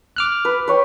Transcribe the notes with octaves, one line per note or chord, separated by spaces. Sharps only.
D6 F6 F#6
B4
B4 C#5 G5